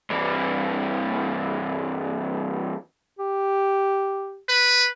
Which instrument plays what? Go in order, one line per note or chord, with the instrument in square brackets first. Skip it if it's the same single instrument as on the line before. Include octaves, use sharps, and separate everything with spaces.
[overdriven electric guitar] G2 E3
[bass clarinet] G4
[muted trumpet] B4